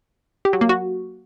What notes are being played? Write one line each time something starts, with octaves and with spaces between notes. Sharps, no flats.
G4
F#3
A#3
F#4